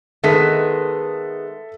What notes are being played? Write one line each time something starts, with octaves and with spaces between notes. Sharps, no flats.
D#3 G#3 B3 A4 E5 B6